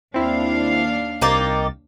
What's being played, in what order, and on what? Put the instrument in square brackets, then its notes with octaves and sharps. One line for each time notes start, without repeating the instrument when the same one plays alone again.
[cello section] D#2 D4 F5 [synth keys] C4 E4
[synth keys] C2 A6 [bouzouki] A#3 D#4 G4